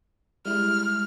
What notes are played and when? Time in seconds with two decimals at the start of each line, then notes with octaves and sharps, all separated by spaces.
0.45 G3 G#3 E4 F6